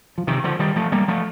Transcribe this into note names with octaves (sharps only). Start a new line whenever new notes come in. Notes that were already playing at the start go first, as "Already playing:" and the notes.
F3
C3 D#3
D3 F3
D#3 G3
F3 A3
G3 A#3
F3 A3